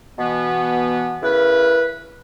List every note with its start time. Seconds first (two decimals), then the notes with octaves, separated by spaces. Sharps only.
0.19 B2 E3 B3
1.22 C#3 E4 A#4 B4